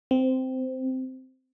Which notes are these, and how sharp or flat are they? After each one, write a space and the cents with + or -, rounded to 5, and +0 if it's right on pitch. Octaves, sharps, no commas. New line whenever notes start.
C4 -10